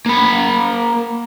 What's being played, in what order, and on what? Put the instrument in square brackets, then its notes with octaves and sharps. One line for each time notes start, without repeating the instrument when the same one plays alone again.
[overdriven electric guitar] A#3 B5